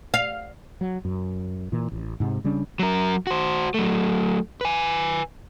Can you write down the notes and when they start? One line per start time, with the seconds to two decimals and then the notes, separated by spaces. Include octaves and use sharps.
0.14 F5
0.81 F#3
1.05 F#2
1.72 A#2 E3
1.92 A1
2.20 G#2 C3
2.44 C#3 G3 C#4 D4
2.79 F#3 A#4
3.27 F#4 C5
3.74 F#3 A3
4.61 B4 G#5